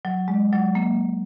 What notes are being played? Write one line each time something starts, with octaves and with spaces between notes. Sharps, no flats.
F#3
G#3
F#3
A#3